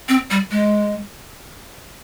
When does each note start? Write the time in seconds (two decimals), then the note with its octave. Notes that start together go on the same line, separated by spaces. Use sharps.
0.09 C4
0.31 G3
0.51 G#3